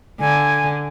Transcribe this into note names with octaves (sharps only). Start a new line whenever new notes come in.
D3 G#5